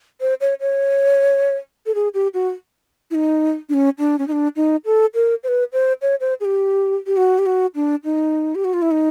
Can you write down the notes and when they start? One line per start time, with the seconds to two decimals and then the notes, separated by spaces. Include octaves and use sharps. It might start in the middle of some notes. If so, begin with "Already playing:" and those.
0.21 C5
0.41 C#5
0.60 C#5
1.86 A4
1.95 G#4
2.14 G4
2.34 F#4
3.11 E4
3.15 D#4
3.69 D4
3.74 C#4
3.99 D4
4.19 C#4
4.28 D#4
4.32 D4
4.56 D#4
4.86 A4
5.14 A#4
5.44 C5
5.48 B4
5.73 C5
6.02 C#5
6.20 C5
6.41 G#4
6.45 G4
7.07 G4
7.17 F#4
7.39 G4
7.46 F#4
7.75 D4
8.04 D#4
8.55 G4
8.64 F#4
8.74 F4
8.82 E4
8.91 D#4